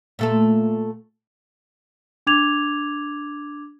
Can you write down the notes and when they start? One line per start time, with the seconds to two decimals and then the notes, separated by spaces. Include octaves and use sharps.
0.19 A#2 A3 A4
2.27 D4 D6 G#6 F7